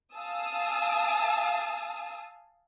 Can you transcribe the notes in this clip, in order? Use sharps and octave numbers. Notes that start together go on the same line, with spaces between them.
F5 G#5 A5 D#6 E6